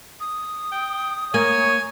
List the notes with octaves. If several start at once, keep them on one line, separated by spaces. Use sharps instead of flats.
D#6
G5
A#3 C#5 G#5